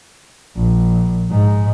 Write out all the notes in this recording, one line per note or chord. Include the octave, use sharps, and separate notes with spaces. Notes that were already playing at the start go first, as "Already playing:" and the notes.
A#1
G#2